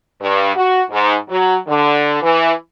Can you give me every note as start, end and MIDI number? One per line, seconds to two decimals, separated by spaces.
0.21 0.53 43
0.55 0.82 66
0.91 1.14 44
1.29 1.56 54
1.68 2.19 50
2.22 2.51 52